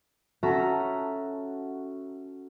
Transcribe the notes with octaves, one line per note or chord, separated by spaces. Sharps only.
C#4 F#4 A4 E5 A#5